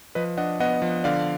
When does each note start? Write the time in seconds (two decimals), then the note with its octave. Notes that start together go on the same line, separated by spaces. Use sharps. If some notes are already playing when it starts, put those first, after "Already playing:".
0.15 F3 B4 D#5
0.37 D4 D#5 F#5
0.60 B3 D#5 F#5
0.82 F3
1.04 D3 D5 F5